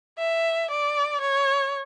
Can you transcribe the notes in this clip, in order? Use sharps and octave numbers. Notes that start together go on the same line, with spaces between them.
E5
D5
C#5